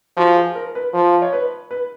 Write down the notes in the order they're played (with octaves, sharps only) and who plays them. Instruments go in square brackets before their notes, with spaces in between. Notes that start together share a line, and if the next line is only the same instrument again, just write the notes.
[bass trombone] F3 [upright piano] F#4
[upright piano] G#4
A#4
B4
[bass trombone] F3
[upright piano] C#5
B4
B4